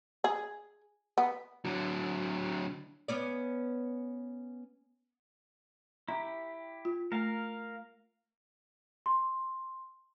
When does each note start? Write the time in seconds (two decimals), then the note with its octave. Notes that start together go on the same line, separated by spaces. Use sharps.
0.24 G#4
1.18 B3
1.65 D3 F#3
3.08 B3 C#4 D5
6.08 E4 G4 A#5
6.85 F4
7.12 A3 A#4 F5
9.06 C6